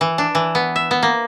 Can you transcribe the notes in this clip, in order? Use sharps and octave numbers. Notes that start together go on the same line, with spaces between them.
E3
D4
E3
B3
E5
B3
A#3